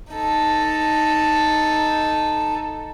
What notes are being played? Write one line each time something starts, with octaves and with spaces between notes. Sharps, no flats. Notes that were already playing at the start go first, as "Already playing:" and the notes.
D#4 A4